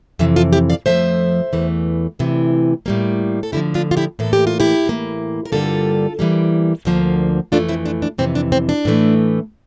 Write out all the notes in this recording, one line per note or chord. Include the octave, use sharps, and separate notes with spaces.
F2 C3 E3 E5
F4 A4
E4 G4
D5 F5
F2 C3 F3 A3 C5 E5
E2 E3 A3
D2 C3 E3
A2 G3 A#3
A4
D2 D3 F3 E4 G4
D4 F4
F4
E4 G4
A2 E3 A#3 A4
G4
F4
E4 G4
A2 E3 A#3
A#4
G2 D3 G3 A#3 F4 A4
E2 E3 G3 A#3
D2 D3 F3 A#3
F2 E3 A3 D4 F4
C4 E4
D4 F4
D4
F2 C3 E3 C4
D4
C4
D4
A2 E3 A3